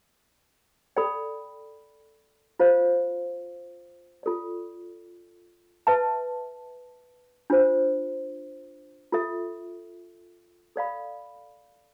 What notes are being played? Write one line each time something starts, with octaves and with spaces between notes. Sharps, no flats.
A4 D5 G5 B5
F4 C5 F5
F4 A4 D5
B4 E5 A5
D4 F4 C5
F4 A4 E5
A4 D5 F5 B5